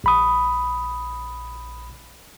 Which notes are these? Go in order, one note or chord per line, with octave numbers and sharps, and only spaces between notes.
A#1 B5 D#6